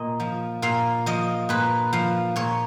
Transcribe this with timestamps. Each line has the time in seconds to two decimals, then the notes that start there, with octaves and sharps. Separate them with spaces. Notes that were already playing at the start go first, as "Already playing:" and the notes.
Already playing: A#2 D#5
0.20 F3
0.62 A#2 F5
1.06 F3 D#5
1.49 A#2 B4
1.93 F3 F5
2.36 A#2 C#5